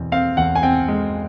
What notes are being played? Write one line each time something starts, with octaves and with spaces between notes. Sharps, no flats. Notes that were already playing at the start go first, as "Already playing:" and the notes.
Already playing: E2 B2 C4
C4 F5
E2 F#5
G#5
C4 G5
G#3